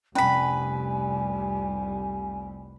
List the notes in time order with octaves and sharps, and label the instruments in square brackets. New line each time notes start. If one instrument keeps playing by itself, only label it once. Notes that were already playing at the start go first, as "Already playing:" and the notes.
[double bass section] F1 C2 G3 [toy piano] C#4 [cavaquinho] B4 B5 [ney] G#5